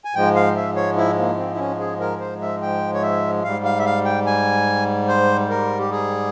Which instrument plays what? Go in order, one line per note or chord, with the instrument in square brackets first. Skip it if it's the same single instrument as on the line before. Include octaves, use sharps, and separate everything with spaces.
[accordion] G#5
G#2 F3 G#3 G5
F5
E5
C#5
E4
A#3
C4
E4
C#4
G#4
A#4
C5
E5
G5
C#5
E5
G#2 G3 F5
F5
E5
F5
G5
G#5
C5
A#4
G4
G#4